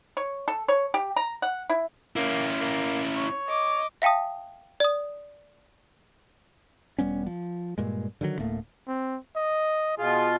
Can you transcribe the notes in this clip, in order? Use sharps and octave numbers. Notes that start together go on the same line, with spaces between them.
C#5
A4
C#5
G4
A#5
F#5
E4
A#3 C#4 E4
A#3
C#5
D#5 D6
E5 F5 G5 A5 D#6
D5 D#6
E1 G3 B3 C#4
F3
G2 A#2 G#3
D3 D#3 F3 F#3
D1 A2 A3 A#3
C4
D#5
B2 F4 G#4